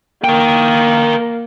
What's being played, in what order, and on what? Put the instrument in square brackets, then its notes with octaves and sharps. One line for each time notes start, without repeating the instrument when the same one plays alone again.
[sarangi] A#3 [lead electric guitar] A#4 G5